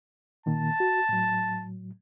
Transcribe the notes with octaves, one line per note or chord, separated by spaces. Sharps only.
A#2 D#3 A#3 A5
F#4
A2 F#3